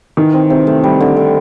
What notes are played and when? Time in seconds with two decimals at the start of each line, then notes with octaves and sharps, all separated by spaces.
0.17 D#3 E3
0.33 C4
0.50 C3
0.67 A3
0.84 G3
1.00 D3
1.17 D3